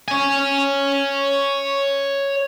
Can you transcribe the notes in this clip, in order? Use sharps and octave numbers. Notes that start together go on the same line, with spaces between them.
C#5 G#5